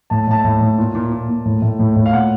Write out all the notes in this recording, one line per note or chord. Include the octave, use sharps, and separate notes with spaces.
A2 A5
A2 A5
A2
A2
A#2
A#2
A#2
A#2
A2
A2
A2
A2
F5
A#2 F#5